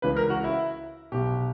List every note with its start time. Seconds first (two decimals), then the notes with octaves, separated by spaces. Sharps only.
0.02 C#2 C#3 E3 B4
0.17 A#4
0.30 F#4
0.44 E4
1.12 B1 B2 G4